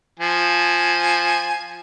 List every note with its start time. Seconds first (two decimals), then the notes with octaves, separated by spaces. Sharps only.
0.20 F3 G#5